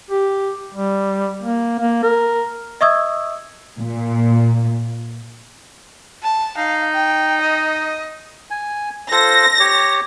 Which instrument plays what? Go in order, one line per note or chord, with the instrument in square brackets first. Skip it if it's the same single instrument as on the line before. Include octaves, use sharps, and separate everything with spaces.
[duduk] G4
G3
A#3
A#3
A#4
[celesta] D#5 E5 C#6 D#6 E6 G#6
[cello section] A#2
[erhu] A5
[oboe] D#4 [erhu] F5
[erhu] G5
D#5
[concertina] G#5
[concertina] F4 A4 C5 [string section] A#6
[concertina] G4 C#5